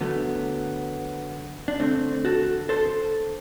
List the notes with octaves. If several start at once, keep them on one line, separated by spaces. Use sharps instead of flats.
D3 F#3 A3 B3
D4
D3 A3 C4
F#4 A4
A4 C5